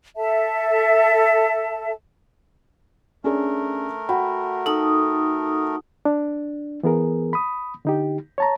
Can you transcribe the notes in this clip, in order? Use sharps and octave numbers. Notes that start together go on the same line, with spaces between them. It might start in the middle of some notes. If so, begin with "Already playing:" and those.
A4 E5 A5
A3 C#4 D4 G#4 A#4
F#4 G5 B5
D#4 A4 D#6
D4
E3 B3 G#4 A#4
B5 D#6
D3 D#4 G4
C#5 A5 A#5